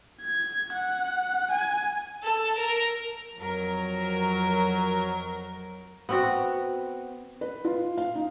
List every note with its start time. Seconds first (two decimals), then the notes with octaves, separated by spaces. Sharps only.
0.21 G#6
0.72 F#5
1.51 G#5
2.24 A4
2.58 A#4
3.36 F2 F#3 A#4
6.09 B3 C4 F#4
7.41 B4
7.65 F4
7.98 F5
8.15 D#4